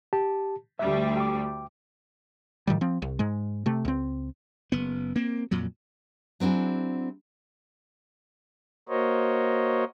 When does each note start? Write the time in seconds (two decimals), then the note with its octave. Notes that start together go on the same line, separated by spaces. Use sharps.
0.13 G4 A5
0.79 D2 G3 E5
1.17 G5 D6
2.67 A2 D#3 F3 G3
2.81 F3 C4
3.02 C2
3.19 G#2 G#3
3.66 C3 A3
3.85 C#2 C4
4.72 F#1 B3
5.16 A#3 C4
5.51 F2 A#2 F#3
6.40 F#3 C4 D4 E4 G#4
8.89 A#3 F#4 A#4 C5 C#5 D#5